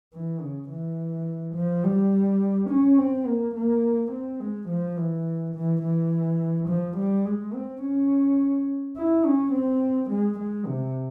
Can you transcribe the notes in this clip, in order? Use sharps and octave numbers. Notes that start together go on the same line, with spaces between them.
E3
C#3
E3
F3
G3
C#4
C4
A#3
A#3
C4
G#3
F3
E3
E3
E3
F3
G3
G#3
C4
C#4
E4
C#4
C4
G#3
G#3
C3